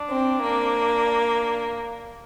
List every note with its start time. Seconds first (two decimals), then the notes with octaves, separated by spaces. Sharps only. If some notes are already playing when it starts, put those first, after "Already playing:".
Already playing: D4
0.09 C4
0.42 A#3
1.06 D4